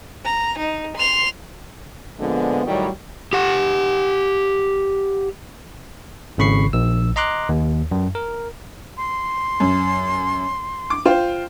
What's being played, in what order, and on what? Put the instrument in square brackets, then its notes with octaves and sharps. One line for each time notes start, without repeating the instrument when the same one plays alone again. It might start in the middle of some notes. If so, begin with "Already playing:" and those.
[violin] A#5
D#4
C6 F7
[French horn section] A#2 D3 F3 G#3 B3
A2 D#3 F#3 G3
[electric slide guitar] G4 F#5
[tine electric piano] G#1 C#3 B5 C#6 C7
A#1 E6
D#5 A#5 C6 D6 F#6
D#2
F#2
A#4
[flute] C6
[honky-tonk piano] F#2
D6
F4 C5 G5